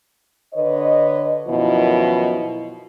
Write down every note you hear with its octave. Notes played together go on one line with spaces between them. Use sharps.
D3 B4 C#5 D#5
F#2 B2 D#3 F3 E4 D#5